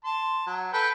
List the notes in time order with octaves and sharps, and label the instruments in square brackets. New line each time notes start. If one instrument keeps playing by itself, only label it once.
[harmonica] A5 C6
F#3
A4 B4 G5